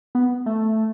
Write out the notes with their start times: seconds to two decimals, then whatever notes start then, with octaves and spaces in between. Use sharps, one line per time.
0.15 B3
0.46 A3